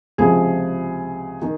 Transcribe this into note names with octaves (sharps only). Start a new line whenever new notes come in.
C#2 C3 F3 G#4
D#3